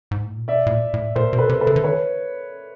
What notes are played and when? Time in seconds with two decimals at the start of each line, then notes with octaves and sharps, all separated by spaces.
0.11 G#2
0.24 A2
0.36 A#2
0.48 B2 D5 E5
0.66 A2
0.71 A#2
0.94 A2
1.16 A#2 A#4 C5
1.33 B2
1.38 A4 B4
1.49 C3
1.61 A4 B4
1.67 C#3
1.76 D3
1.84 D#3 B4 C#5